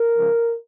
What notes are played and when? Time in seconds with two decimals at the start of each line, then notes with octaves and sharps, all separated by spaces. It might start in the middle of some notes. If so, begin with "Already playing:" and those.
Already playing: A#4
0.17 C#3 F3 G#3